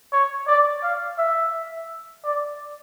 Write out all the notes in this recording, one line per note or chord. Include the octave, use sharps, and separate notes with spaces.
C#5
D5
F5
E5
D5